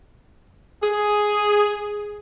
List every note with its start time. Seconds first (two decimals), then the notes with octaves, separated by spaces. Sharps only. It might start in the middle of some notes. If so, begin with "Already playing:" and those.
0.82 G#4